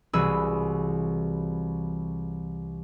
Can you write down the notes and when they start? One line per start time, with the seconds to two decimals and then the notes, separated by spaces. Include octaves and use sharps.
0.13 C2 E3 F#4 G#4 B5 E6